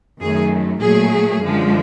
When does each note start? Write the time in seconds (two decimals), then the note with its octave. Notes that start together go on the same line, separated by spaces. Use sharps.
0.20 F#2 D#3 F#3 A3 G#4
0.81 A#2 F#3 A3 G#4
1.42 F#2 D3 F3 G#3